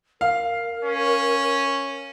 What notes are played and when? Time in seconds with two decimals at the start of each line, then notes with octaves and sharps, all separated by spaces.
0.21 A#4 F5
0.84 C#4